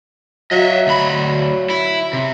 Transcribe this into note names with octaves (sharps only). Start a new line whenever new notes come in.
F#3 D#5 E5
D2 B5
E4
C3